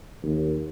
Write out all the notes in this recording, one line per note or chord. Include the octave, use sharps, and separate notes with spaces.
D#2